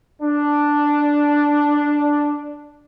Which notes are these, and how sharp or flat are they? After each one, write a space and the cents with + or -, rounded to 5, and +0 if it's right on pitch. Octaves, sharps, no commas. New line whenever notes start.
D4 +0